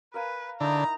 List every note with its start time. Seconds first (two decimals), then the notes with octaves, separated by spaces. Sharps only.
0.14 A#4 B4 F5 G#5
0.61 D3 D#4 E4 A#5